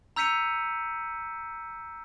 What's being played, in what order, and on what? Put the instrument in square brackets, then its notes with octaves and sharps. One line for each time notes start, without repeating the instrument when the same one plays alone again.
[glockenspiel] A#5 E6 G6 B6 C#7 D#7